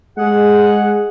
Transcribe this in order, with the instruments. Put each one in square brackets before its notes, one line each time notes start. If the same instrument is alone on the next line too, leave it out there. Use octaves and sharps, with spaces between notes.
[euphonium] G#3 [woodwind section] G#4 F#5